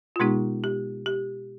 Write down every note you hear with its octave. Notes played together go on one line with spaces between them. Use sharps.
F4
B2 G#3 B3 D#4 G4
G4
G4